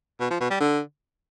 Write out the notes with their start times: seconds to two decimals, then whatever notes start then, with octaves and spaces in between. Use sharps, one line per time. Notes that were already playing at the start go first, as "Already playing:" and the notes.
0.20 B2
0.30 F3
0.40 B2
0.50 G3
0.60 D3